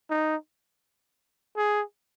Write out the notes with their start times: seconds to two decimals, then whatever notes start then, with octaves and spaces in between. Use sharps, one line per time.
0.10 D#4
1.57 G#4